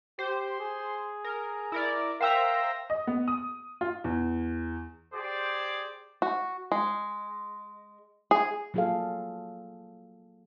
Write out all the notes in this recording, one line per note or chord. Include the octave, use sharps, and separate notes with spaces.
G4 C5
G#4
A#4
E4 A#4 D5
A#4 C5 E5 F5 G5 A#5 E6
D#5
B3
D#6
F4
E2
G4 G#4 C5 D5 D6
F#4
G#3
G#4
F#3 A#3 F4 G#4 A4 F5